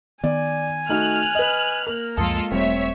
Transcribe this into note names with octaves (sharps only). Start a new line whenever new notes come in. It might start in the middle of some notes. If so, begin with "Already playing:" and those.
D#3 B3 D5 G#5
A3 D#4 F#4 F6 F#6
B4 D#5
A#3 A#4
C#2 F#2 F3 G#3 F4 A4 D#6
E1 G3 A3 C4 C#5 E5